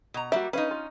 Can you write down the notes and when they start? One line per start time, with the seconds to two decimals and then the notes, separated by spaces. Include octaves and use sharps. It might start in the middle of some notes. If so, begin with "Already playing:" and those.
0.14 B2 A#5
0.32 G3 A#3 F#4 E5
0.53 C#4 D#4 B4 F5
0.71 F4